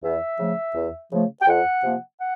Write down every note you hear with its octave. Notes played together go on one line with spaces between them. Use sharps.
E2 E5
C#3 F3 A3
E2
C#3 F3 A3
G5
F2 F#5
C3 F3 A#3
F#5